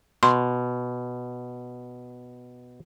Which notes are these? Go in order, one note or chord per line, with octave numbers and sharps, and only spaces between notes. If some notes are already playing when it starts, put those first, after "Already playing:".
B2 C6